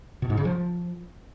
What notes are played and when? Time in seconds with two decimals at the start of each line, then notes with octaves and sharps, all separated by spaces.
0.22 B2
0.30 G#2
0.37 C#3
0.45 F3